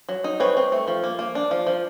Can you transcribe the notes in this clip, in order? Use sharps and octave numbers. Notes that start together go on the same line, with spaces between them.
F#3
D#4
C4 B4 C#5
C4
A3
F3
A#3
A#3
D4
F3
F3